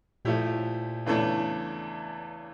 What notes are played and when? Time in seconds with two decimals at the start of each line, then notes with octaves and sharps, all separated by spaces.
0.25 A#2 F3 A3 E4 G4
1.06 E2 C#3 E3 A3 D4